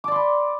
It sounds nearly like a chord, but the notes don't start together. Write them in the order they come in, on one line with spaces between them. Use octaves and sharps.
D6 D5 C6 B5